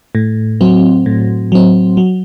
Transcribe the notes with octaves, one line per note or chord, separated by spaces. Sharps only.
A2
F#3 C4
A2
F#3 C4
F#3